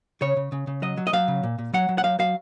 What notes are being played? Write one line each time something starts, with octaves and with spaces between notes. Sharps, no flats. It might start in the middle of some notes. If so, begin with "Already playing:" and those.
C#3 C#5
C#3
C#3
C#3
F#3 D#5
F#3
D#5
F#3 F5
C#3
A#2
A#2
F#3 F#5
F#3
F#5
F#3 F5
F#3 F5